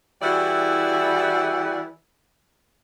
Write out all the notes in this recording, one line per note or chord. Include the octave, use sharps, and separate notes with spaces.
E3 G3 E4 F#4 G#4 D5